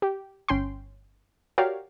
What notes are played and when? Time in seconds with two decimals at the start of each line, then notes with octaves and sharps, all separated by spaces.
0.02 G4
0.48 G1 C#4 G5 C6
1.58 F#4 G4 A#4 C#5 D5 F5